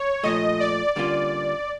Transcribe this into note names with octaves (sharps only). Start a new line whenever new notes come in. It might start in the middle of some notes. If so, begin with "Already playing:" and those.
Already playing: C#5
A#2 F3 A3 D#5
D5
D3 G3 A#3 C#4 F4 D5